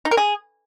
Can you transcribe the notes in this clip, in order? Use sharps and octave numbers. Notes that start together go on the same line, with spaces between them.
D#4
A#4
G#4